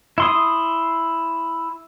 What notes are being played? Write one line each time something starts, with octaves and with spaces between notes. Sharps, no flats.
E4 C6 D#6